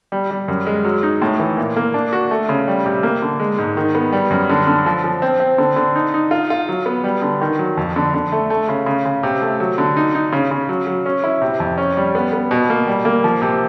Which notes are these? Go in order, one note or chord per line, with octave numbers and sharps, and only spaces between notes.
G3
G3
F#2
G#3
F#3
D#4
A2
E3
A#2
A#3
D4
F#4
A3
C#3
G3
C3
A#3
D3
G#3
G#2
D#3
B3
G3
F#2
D3
D3
F3
F3
C4
C4
D3
D3
D#4
D#4
F4
F4
F#3
B3
G3
D3
D#3
F#3
F2
D3
D3
A3
A3
C#3
C#3
C#3
C3
A3
F#3
D3
D#4
D#4
C#3
C#3
F#3
F#3
C#4
E4
C3
F2
C#4
G3
B3
B3
B2
A#3
G3
A#3
F3
C3